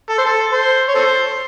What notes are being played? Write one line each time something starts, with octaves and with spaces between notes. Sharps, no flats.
A4
C5
A4
C5
C#5
A4 C5